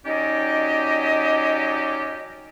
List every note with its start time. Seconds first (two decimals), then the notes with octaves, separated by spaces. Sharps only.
0.06 F#3 C#4 D#4 G4 D5 D#5